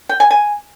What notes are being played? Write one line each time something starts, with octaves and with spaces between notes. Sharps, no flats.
G5
G#5
G#5